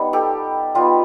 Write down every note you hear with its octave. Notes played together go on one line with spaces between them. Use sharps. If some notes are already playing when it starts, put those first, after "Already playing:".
Already playing: G3 B3 D#4
G4 A4
G3 B3 D#4 F4 G4